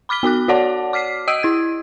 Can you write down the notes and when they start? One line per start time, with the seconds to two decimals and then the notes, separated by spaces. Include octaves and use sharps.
0.09 B5 D6 F6 B6 G7
0.23 B3 F#4 D6 F#6
0.48 F#4 C#5 D5 F#5 A5 D6
0.93 D6 F6 B6 C7
1.28 D#5 D#6 E6 D7 D#7
1.43 E4 G#6